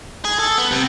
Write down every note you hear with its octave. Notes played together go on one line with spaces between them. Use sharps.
G#4
A4
B3
C3